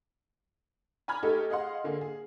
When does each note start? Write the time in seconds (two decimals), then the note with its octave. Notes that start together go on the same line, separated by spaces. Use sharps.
1.08 G#5 A#5 B5 F6 G#6
1.23 A3 D#4 G4 A4
1.50 G#4 D#5 F5 F#5 C6
1.84 D3 A#3 G#4
2.01 G#4